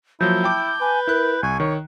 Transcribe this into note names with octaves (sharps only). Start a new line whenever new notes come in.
F3 F#3 A#3 E4 G6
G5 A5 D6
B4 G#5
E4 A#4 F#6
C2 G#5 C#6
D#3 C#5